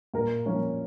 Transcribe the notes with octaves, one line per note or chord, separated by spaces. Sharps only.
A#2 A#4
F3 A#3 C#4